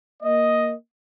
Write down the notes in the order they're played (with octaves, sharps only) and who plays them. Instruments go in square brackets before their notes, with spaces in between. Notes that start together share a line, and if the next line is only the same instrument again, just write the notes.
[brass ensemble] A#3 D#5